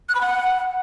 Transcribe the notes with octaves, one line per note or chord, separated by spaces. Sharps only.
F#6
B5
F#5